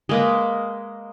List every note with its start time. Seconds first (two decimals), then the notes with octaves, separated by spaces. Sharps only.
0.09 G#3 A#3 B4